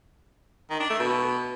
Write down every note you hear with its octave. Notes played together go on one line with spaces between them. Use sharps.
D#3
D4
A3
B2